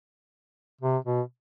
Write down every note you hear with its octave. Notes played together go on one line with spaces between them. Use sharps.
C3
B2